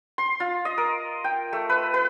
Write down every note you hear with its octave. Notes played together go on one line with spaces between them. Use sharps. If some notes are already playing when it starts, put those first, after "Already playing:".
C6
F4
D#5
A#4
G5
A3
B4
B4